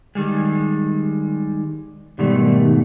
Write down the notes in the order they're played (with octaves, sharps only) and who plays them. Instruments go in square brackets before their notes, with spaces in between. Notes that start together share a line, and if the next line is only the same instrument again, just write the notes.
[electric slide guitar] D#3 G3 G#3
[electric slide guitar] G#2 B2 A3 [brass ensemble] D#3 G3